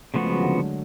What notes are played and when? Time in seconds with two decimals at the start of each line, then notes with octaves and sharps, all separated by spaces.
0.14 C#3 F3 A3 B3 F#4
0.25 G#3
0.32 F#3
0.43 D3
0.57 F#3